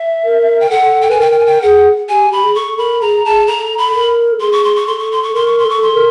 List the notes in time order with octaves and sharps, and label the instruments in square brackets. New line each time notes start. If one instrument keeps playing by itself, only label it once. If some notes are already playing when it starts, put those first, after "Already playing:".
Already playing: [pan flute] E5
[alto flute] A#4
[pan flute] G5
[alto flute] A4 [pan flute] F#5
[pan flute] G5
[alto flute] B4 [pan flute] G#5
[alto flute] A#4 [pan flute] G5
[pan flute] G5
G#5
G5
[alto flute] G#4 [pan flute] F#5
[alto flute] G4 [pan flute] G#5
[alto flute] G4 [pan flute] B5
[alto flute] G#4
[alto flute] A4 [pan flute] C#6
[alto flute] A#4 [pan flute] B5
[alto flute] G#4 [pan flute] A#5
[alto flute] G#4 [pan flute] A5
[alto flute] A4 [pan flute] A#5
[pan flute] B5
[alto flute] A#4
A4
[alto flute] G#4 [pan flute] C6
[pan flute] C#6
C6
C#6
[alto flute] A4 [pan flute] C6
[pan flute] C#6
C6
C#6
[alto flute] A#4 [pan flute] C6
[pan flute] C#6
C6
[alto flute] A4
[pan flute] C#6
C6
[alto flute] A#4